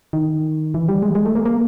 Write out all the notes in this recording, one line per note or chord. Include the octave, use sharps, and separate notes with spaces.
D#3
E3
G3
G#3
G#3
A3
A#3
A#3